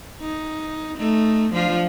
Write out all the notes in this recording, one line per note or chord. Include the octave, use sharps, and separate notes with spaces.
D#4
A3 D#4
F3 D4 F4